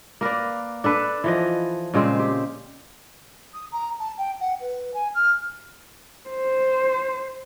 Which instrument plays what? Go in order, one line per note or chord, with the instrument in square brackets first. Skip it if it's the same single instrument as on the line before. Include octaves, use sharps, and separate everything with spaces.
[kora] A#3 A#4 B4 D5
D4 A4 B4
E3 F3 D#5
A#2 C#3 G#3 C4
G4
[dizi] D#6
A#5
A5
G5
F#5
B4
G#5
F6
[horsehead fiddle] C5